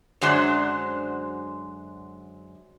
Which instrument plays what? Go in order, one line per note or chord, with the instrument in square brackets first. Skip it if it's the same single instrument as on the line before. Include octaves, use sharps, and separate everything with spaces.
[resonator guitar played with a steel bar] F#2 D3 F#3 G#3 D4 C5